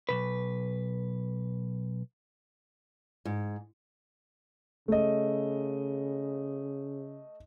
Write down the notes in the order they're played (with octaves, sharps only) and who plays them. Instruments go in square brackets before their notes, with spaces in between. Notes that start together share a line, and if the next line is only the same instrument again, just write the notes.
[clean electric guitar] B1 A#2 B4
[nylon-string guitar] G#2
[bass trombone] C#3 [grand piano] A3 D#5